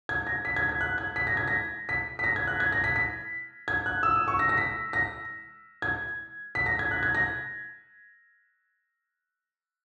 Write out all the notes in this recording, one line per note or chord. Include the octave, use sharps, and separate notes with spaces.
G#6
A#6
B6
G#6
G#6
F#6
G#6
B6
A#6
G#6
A#6
B6
B6
A#6
G#6
F#6
G#6
A#6
B6
B6
G#6
F#6
E6
D#6
C#6
A#6
A#6
B6
A#6
G#6
B6
A#6
G#6
F#6
G#6
A#6